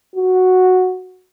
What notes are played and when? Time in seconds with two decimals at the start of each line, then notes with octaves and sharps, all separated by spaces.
0.16 F#4